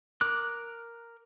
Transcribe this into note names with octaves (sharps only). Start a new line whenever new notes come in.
A#4 D6 F#6